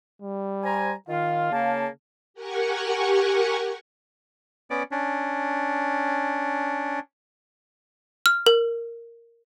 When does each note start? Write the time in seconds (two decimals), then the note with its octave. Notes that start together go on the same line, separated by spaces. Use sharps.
0.21 G3
0.64 C5 G#5 A#5
1.08 D#3 F4 F5
1.52 C#3 A#3 A5
2.34 G4 A#4 F#5 G#5 C#6
4.70 B3 C#4 D5
4.91 C#4 D4
8.26 F6
8.46 A#4